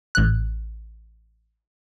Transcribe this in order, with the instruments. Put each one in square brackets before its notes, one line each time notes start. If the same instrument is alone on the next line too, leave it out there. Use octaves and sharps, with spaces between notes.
[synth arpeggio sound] A1 F#6